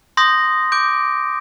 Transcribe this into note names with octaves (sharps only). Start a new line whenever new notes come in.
C6 D#6 G6 A#6
D6 G6 D7